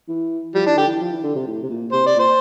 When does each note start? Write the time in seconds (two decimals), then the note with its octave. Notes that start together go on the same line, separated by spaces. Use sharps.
0.08 E3
0.54 F3 G3
0.65 E3 D4
0.76 D3 G4
0.87 E3
1.01 F3
1.12 E3
1.23 D3
1.35 C3
1.47 A2
1.63 C3
1.70 A#2
1.92 C3 C5
2.04 C3 D5
2.16 A#2
2.19 C5